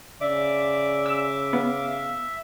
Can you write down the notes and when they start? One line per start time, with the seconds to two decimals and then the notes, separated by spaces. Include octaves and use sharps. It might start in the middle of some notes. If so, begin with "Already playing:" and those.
0.21 C#3 D5 E5 D6
1.06 E6
1.53 B3 F5
1.89 E5